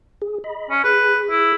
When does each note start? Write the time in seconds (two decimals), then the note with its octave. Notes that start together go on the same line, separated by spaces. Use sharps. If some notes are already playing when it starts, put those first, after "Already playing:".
0.22 G#4
0.44 D#5 B5
0.70 C#4
0.84 G#4 B4
1.30 E4